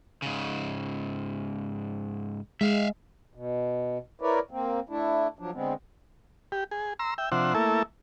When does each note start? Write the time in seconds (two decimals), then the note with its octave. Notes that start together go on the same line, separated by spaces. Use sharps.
0.22 G#2 C#3
2.61 G#3 E5 F5
3.35 B2
4.21 E4 A#4 B4 C#5 D5
4.51 A#3 C4
4.89 A3 D4 E4
5.39 F3 F#3 D4
5.54 D3 G#3 B3 C4
6.52 G4
6.71 G#4
6.99 A#5 C6 E6
7.18 E5 G5
7.32 C3 F3 D4 C5 E5 F#5
7.55 A3 A#3 E4 A4 E5